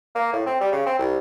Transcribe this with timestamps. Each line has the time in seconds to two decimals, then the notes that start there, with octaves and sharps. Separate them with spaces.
0.15 A#3
0.33 A2
0.46 C4
0.61 G3
0.72 C#3
0.86 C4
0.99 C2